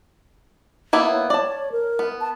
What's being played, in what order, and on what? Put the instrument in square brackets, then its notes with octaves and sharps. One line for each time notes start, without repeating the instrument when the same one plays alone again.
[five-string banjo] A#3 B3 E4
[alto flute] C#5
[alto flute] C#5 [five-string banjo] D5 A5
[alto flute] A#4
[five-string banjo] B3
[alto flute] A5